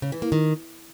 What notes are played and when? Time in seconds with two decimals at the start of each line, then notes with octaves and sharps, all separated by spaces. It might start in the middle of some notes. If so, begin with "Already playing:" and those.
0.02 C#3
0.12 E3
0.22 A#3
0.32 D#3